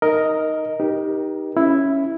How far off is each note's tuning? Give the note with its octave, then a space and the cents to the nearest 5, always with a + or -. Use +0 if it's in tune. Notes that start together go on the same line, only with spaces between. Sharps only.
D#4 +0 A#4 +0 D#5 +5
D#4 +0 G4 +0 A#4 +35
C#4 +0 E4 +0